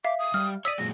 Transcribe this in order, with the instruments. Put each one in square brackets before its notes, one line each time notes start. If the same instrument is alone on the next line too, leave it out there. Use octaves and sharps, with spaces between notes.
[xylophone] E5 F5 [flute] D6
[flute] D#6
[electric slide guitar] G3 G4 [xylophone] F6
[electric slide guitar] C#5 D5 [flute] D#6 [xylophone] E6 B6 D#7
[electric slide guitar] A#2 F#3 G#3 [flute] A#6